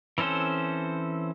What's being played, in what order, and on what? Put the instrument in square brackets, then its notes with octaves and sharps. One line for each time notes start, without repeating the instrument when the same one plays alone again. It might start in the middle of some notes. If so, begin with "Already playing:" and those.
[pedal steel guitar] E3 C4 C#4 A4 C5